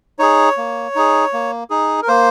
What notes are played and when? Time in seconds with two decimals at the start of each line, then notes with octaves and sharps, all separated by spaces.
0.19 D#4 G#4 C#5
0.57 A#3
0.95 D#4 G#4
1.33 A#3
1.70 D#4 G#4
2.02 A#4
2.08 A#3 C5